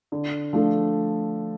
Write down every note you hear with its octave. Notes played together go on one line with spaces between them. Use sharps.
D3
F3 A3 D4 A4